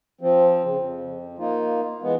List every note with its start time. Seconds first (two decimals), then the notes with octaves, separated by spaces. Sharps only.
0.21 F3 C4
0.63 C#3
0.77 F2
1.39 A#3 D#4 F4
2.02 E3 G#3 B3